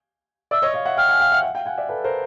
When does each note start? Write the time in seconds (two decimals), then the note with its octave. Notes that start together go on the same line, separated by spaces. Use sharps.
0.51 D5 E5 E6
0.62 C#5 D#5
0.74 D#5 F5
0.86 E5 F#5
0.97 F5 G5 F6
1.09 F#5 G#5
1.20 F5 G5
1.31 E5 F#5
1.43 E5 F#5
1.55 F5 G5
1.66 F#5 G#5
1.78 D5 E5
1.89 A4 B4
2.04 A#4 C5